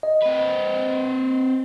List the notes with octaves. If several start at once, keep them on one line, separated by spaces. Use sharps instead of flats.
D#5
C4 B4